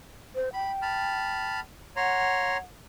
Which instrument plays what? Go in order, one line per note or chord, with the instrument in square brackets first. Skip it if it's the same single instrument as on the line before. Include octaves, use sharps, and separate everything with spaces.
[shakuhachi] C5
[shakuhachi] G5 [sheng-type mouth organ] B5
[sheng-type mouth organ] A5 B5 F6
[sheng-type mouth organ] C#5 A#5 C6 [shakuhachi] F#5